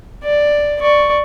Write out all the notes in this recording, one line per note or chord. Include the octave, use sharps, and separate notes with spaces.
D5
D5 C#6